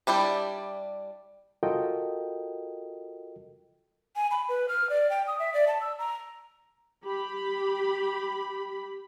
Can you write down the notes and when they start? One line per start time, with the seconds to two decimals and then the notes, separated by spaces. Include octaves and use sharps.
0.07 G3 D4 E4 G4
1.63 F4 F#4 A4 A#4 D#5 G5
4.16 G#5
4.31 B5
4.49 B4
4.69 F6
4.90 D5
5.10 G5
5.27 D#6
5.39 E5
5.54 D5
5.68 A5
5.81 E6
5.99 A#5
7.05 G4 B5